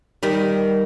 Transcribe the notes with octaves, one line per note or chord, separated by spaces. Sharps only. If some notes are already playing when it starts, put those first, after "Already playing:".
D#3 G3